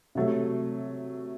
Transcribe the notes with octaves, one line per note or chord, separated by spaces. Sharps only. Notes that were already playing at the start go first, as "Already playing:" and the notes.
C3 F#3 A3